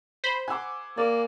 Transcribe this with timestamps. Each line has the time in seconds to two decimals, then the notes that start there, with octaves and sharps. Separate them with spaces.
0.24 C5 B5
0.48 F#5 G#5 C6 D6 E6
0.97 A#3 D5